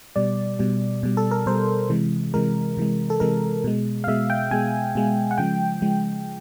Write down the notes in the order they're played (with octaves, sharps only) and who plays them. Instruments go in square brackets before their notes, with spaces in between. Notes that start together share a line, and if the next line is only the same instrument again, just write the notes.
[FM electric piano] B2 G3 D5
B2 G3
B2 G3
A4
A#4
B2 G3 C5
C3 E3 G#3
C3 E3 G#3 A#4
C3 E3 G#3
A4
C3 E3 G#3 A#4
B2 G#3
F5
B2 G#3 E5
G5
B2 G#3 G#5
B2 G#3
F#5
C#3 F3 G#3 G5
C#3 F3 G#3